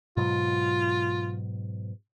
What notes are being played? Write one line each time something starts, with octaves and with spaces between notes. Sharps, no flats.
G#2 B2 F#3 F4